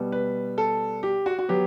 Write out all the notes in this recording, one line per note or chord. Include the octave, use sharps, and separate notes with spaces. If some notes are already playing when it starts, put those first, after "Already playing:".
Already playing: B2 G3 B3
B4
A4
G4
F#4
F#4
F#3 B3 G4